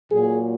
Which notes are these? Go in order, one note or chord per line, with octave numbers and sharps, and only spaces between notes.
A#2 F#3 G#4